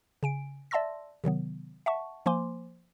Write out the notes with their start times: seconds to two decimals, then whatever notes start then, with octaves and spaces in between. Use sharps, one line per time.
0.23 C#3 G#5 D7
0.71 D5 E5 A5 C6 E6 A#6
1.24 C3 D#3 F#3 B3
1.86 E5 F#5 A5 C#6
2.26 F3 A#3 C5 G#5 C6 D6